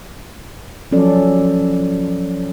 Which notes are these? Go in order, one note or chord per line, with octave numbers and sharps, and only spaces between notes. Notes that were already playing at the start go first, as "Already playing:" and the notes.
F3 F#3 C#4 A4 D5